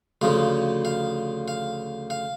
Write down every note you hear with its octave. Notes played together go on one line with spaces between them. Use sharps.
D2 C#3 F3 F5
F5
F5
F5